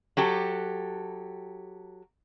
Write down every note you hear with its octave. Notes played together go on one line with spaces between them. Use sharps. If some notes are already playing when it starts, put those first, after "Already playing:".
F#3 G4 A4